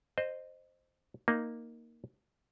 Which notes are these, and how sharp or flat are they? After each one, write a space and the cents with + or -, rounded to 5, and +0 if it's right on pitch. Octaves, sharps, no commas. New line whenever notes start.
C5 +0 D#5 -20
A#3 +0 D#4 +0